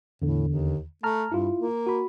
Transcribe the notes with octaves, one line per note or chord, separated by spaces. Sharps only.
E2 A2 D3
D#2
A3 A5 A#5 F6
G2 E4 F4
A#3
F#4 B5